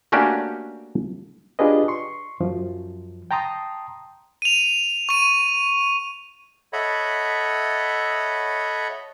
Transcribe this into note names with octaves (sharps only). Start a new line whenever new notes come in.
A3 A#3 C#4 D4 F#4 G4
D4 F4 G4 G#4 B4 D#5
C6 C#6
F#2 F3
G5 A5 A#5 C6 D#6
D#7 F7
C#6 D#7
A4 C#5 D#5 E5 F#5 B5